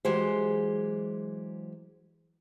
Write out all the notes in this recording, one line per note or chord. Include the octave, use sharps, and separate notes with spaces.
E3 F#3 G#3 G4 G#4 C5